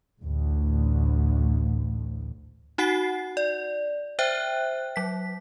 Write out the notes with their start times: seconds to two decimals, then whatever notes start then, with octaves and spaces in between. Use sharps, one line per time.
0.22 A1 D2 A2
2.78 D#4 F#4 F#5 C7
3.37 D5
4.19 C5 E5 G5 F#6
4.96 F#3 B6